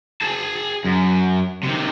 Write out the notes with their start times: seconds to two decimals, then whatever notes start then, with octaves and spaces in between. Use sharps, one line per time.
0.22 G#4 A5
0.85 F#2
1.63 C3 D#3